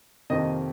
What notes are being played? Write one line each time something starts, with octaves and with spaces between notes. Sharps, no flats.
F2 C3 D#3 A#3 D#5